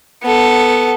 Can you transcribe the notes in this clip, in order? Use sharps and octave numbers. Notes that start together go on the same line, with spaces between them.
B3 A4